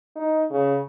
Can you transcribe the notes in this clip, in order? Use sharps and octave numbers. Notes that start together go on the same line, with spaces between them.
D#4
C#3